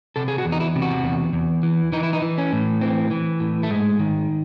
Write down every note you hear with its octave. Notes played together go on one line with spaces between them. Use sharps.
C3 A4
G#4
F#4
E2
D#4
E4
C3
F#4
E2
E2
E3
E3 D#4
E4
D#4
E3
C#4
A2
E3 C4
E3
A2
A3
G#2 G#3
D#3